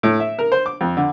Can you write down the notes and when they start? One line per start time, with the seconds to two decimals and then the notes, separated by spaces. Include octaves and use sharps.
0.03 A2
0.20 E5
0.39 A#4
0.52 C5
0.66 D6
0.81 F2
0.97 D3